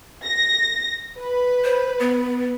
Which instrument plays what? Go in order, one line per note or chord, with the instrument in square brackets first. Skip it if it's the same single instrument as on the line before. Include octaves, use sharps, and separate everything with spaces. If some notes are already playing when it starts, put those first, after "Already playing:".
[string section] A#6
B4
[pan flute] C5
B3